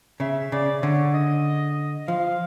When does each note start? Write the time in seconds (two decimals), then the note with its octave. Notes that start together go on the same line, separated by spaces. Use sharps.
0.20 C#3 E5
0.52 C#3 D5
0.83 D3 C#5
1.14 D#5
2.08 F3 F5